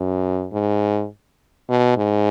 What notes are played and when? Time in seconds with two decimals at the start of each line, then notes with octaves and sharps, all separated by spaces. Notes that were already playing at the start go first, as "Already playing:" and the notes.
Already playing: F#2
0.53 G#2
1.69 B2
1.97 G#2